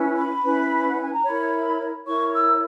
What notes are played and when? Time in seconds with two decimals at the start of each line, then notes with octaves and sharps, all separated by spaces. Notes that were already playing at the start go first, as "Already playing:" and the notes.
Already playing: C#4 E4 B4
0.18 B5
0.44 C#4 E4 B4
0.88 F#5
1.00 G#5
1.13 A#5
1.25 E4 A#4 C#5 B5
2.06 E4 A#4 C#5 C#6
2.33 E6